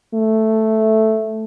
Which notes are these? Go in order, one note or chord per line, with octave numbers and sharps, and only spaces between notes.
A3